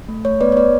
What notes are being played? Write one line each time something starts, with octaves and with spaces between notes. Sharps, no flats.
A3
A3 C#5
B3 B4 D5
C#5
B3 B4 D5